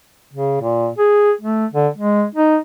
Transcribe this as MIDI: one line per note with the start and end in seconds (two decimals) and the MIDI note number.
0.33 0.59 49
0.62 0.89 46
0.98 1.31 68
1.41 1.66 57
1.73 1.88 50
1.97 2.25 56
2.35 2.58 63